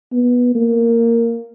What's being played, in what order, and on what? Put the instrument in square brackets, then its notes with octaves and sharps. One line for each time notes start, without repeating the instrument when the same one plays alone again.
[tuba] B3
A#3